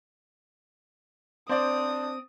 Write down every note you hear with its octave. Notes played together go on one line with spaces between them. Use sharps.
C4 D4 C5 D5 D#6